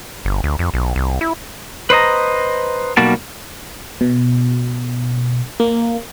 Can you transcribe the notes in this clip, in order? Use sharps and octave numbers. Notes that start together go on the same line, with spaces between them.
G1
D2
F2
B1
C2
E4
B4 C5 D#5 A#5
B1 G3 A#3 F#4 A5
B2
A#3